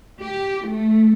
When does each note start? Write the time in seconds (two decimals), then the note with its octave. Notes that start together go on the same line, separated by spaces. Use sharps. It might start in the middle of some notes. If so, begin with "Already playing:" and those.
0.20 G4
0.67 A3